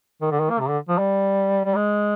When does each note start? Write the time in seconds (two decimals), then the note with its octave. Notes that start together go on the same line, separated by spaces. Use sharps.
0.22 D#3
0.31 D3
0.40 D#3
0.50 A#3
0.60 C3
0.69 D3
0.89 F3
0.98 G3
1.65 G3
1.75 G#3